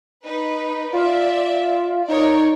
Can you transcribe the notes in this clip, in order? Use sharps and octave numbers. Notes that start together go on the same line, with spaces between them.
D#4 B4
F4 D5 E5
D#4 A#4 C#5 D5